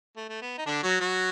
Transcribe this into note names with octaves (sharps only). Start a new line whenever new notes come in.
A3
A3
B3
D#4
D3 D4
F#3 F#4
F#3 F#4